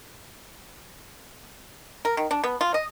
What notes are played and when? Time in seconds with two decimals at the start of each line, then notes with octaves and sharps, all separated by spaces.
2.05 A#4
2.17 D#3
2.31 D4
2.44 B3
2.61 F4
2.74 D#5